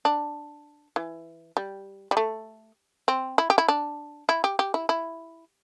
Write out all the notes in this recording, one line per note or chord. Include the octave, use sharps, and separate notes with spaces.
D4
E3
G3
G3
A3
C4
E4
G4
E4
D4
E4
G4
G4
E4
E4